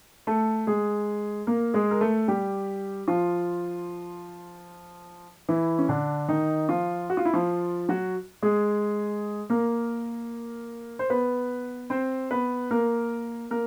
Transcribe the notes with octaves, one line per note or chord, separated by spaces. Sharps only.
A3 A4
G#3 G#4
A#3 A#4
G#3 G#4
A#4
A3 A4
G3 G4
F3 F4
E3 E4
C#4
D3 D4
D#3 D#4
F3 F4
F#4
F4
E4
F3 F4
F#3 F#4
G#3 G#4
A#3 A#4
C5
B3 B4
C4 C5
B3 B4
A#3 A#4
A#3 A#4